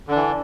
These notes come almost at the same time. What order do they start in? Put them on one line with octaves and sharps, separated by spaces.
D3 D4 E3